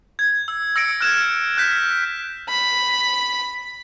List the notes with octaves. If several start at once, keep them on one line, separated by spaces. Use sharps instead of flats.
G#6
E6
E6 A#6 C#7 D7
F6 F#6 G#6 E7
F#6 G6 B6
B5